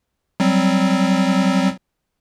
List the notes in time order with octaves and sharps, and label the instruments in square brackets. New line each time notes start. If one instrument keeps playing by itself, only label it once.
[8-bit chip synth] F#3 G3 C4